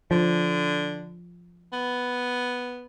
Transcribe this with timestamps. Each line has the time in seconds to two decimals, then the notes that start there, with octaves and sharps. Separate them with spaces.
0.11 D3 F3
1.73 B3